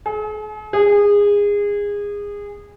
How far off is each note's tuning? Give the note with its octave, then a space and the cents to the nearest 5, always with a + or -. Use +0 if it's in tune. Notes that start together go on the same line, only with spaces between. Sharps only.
G#4 +45
G#4 -25